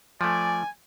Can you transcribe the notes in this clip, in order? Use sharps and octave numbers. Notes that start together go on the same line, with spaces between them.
F3 A3 D5 G#5